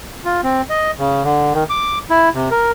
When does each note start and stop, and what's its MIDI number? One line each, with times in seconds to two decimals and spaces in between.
0.25 0.41 65
0.44 0.62 60
0.70 0.91 75
0.98 1.23 49
1.24 1.53 50
1.53 1.64 51
1.70 1.99 86
2.10 2.29 64
2.35 2.49 48
2.51 2.71 70